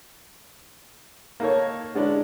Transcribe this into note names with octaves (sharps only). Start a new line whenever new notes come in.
A#3 D#4 A4 C#5
D3 G#3 C#4 D4 E4